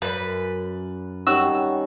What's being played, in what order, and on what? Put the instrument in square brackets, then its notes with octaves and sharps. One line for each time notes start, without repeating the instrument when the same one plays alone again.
[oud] F#2 [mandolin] B4 B5
[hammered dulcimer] D#3 G3 C#4 [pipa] F#4 [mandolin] E6